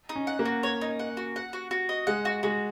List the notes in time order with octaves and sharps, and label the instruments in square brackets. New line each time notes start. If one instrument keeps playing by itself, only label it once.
[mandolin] D#4
[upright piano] C#4
[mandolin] F#5
[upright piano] A#3
[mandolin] F#4
C#5
D#4
F#5
F#4
F#5
F#4
F#4
D#5
[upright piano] G#3 [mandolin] F#5
[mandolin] F#4
[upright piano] G#3 [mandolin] F#4